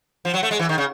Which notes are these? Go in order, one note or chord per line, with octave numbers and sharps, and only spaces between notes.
F3
F#3
A3
G#3
E3
D#3
C#3